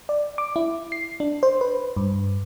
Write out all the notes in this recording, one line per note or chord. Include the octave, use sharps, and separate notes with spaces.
D5
D6
E4
C7
D4
C5
B4
G2